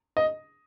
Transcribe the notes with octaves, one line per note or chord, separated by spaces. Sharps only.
D#5